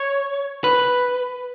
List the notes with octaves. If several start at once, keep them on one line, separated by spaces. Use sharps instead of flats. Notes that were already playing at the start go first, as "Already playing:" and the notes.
Already playing: C#5
B4